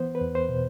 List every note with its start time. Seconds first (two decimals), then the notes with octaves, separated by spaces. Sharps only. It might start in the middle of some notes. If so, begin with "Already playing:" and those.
Already playing: E3 B3 C5
0.15 B4
0.21 E2
0.35 C5
0.49 B2